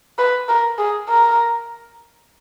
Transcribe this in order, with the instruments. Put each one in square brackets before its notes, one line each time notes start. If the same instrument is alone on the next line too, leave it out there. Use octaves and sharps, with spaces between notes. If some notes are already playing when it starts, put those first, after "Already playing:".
[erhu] B4
A#4
G#4
A#4